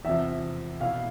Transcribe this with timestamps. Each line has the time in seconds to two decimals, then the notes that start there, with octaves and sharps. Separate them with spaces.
0.05 E2 C3 F3 E5
0.80 B2 B3 E4 F5